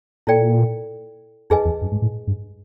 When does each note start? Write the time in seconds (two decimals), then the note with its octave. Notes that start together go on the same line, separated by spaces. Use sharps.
0.27 A#2 E4 A4 D5 G5
1.50 F2 D#4 G#4 B4 D#5 G#5
1.65 E2
1.81 F#2
1.92 G#2
2.02 A2
2.27 G2